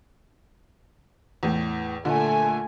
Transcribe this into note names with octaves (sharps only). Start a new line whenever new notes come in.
E2 A2
A#2 D3 A3 G#5